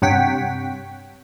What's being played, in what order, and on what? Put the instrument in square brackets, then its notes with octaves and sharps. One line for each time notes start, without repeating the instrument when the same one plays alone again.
[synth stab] G2 C3 C#5 F#5 G5 B6